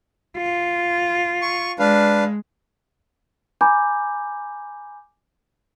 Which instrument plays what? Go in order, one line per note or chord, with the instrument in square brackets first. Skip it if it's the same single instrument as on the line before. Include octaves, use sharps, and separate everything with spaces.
[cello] F4
[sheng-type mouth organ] C#6
[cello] G#3 [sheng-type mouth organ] D4 B4 F5
[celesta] G#5 A#5 B5 D6 G6